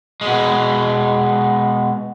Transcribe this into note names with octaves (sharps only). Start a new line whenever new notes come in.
B2 G#3